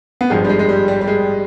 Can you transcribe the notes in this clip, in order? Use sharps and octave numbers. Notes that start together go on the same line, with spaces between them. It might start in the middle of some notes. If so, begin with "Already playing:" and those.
B3
G#1 G2 F3 G#3
G3
G#3
G#3
G3
G3
G3
G#3